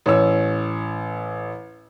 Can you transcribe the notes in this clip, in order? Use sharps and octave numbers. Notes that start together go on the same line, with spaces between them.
A1 C#5 E6